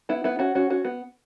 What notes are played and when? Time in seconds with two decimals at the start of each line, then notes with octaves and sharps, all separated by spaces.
0.09 B3 E4
0.24 B3 E4
0.39 C#4 F#4
0.55 C#4 F#4
0.70 C#4 F#4
0.85 B3